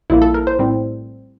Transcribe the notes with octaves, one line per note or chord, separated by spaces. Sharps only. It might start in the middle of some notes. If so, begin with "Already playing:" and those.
A#1 A#2 G3 A#3 E4
A4
A#4
C5
A2 G3 C4